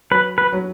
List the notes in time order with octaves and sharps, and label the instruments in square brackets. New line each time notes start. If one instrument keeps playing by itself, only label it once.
[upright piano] F#3 [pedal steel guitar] B4
[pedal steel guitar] B4
[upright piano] F#3